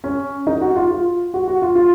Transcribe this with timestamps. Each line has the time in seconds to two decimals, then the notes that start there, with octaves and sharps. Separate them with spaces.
0.04 C#4
0.47 D#4
0.61 F#4
0.76 F4
0.91 F4
1.34 F#4
1.48 F#4
1.62 F4
1.75 F4